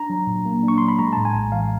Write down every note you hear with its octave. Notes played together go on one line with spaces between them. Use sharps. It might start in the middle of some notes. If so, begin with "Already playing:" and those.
Already playing: D4 A#5
F#3
A#2
A#3
D4
C#6
F#3 C6
B5
G#3 A#5
A2 A5
G#5
A#1
E3 F5